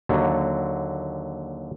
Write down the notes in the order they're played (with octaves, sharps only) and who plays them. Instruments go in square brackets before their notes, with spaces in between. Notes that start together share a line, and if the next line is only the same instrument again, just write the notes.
[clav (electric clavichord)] D#2 D3 F#3